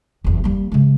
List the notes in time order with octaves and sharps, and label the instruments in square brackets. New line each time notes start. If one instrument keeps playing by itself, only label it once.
[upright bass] F#1 E2
G3 A#3
C#3 G#3